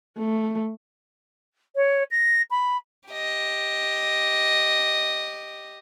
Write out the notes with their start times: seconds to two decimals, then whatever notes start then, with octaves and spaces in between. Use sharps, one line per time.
0.18 A3
1.75 C#5
2.11 A#6
2.50 B5
3.10 G4 D#5